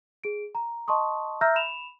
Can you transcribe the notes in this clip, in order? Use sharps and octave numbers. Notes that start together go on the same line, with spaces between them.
G#4 D7
A#5
D#5 A5 C6 C#6 D#6
E5 A#5 E6 F6 G6 A#6
B5 E7 F7